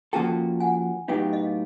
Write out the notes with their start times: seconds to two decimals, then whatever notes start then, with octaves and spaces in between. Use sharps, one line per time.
0.13 F3 A#3 C#4 F#4 A4 G5 A5
0.60 F#5 G#5
1.08 A2 F#3 B3 D#4 G4 F5 G5
1.33 D#5 F5